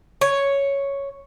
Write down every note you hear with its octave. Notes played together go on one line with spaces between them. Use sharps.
C#5